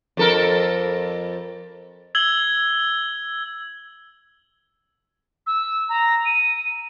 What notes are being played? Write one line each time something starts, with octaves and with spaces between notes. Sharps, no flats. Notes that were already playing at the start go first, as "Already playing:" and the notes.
F2 A4 A#4
E6 G#6 F#7 G7
E6
A#5
D#7